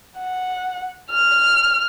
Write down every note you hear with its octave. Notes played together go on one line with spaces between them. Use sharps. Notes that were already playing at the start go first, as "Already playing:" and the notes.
F#5
F6